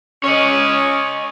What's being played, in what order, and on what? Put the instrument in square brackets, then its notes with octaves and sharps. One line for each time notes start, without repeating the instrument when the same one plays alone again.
[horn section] C#4 [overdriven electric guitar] C#5 D#5